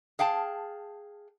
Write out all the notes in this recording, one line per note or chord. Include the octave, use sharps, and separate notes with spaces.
G#4 F5 G5 A5